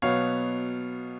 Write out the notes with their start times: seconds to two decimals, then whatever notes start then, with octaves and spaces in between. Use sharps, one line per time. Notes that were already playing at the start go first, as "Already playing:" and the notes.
0.02 B2 F#3 B3 C#5 F5